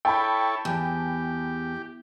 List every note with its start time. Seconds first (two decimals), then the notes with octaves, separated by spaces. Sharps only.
0.05 E4 A4 C#5 G5 A5 B5
0.65 E2 G4